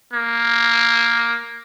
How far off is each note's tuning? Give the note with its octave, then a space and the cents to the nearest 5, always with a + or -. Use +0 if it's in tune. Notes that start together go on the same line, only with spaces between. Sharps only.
A#3 +0